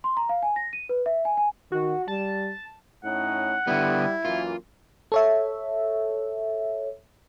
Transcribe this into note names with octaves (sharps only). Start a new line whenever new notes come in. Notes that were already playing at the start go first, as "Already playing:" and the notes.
C6
A#5
F5
G#5
A#6
D#7
B4
E5
G#5
G#5
D#3 F#4
G3 A5
A2 C#4 D#4 F#5
D3 G3 B3 E4
F#2 E3 A#3 F4
A4 C#5 E5